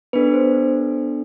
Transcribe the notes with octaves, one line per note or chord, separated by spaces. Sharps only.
B3 D4 A4 B4
C5